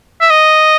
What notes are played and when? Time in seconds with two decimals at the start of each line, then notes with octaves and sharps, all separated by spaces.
0.21 E5
0.30 D#5